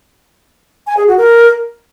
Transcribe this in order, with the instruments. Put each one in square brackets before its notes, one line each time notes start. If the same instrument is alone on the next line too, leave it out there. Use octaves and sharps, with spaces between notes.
[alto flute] G#5
G#4
F#4
A#4